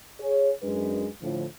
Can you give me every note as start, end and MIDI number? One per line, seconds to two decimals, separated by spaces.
0.19 0.50 68
0.19 0.50 73
0.63 1.06 42
0.63 1.06 56
0.63 1.06 62
0.63 1.06 71
1.22 1.44 45
1.22 1.44 50
1.22 1.44 53